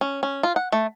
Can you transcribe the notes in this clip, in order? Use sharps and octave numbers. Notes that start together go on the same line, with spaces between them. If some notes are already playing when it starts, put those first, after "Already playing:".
C#4
C#4
F4
F#5
A3